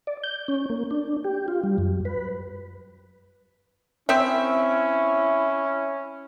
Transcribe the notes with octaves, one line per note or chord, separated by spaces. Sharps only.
D5
G6
C#4
A#3
D4
G4
F4
G3
F#2
B4
C4 C#4 E4 E5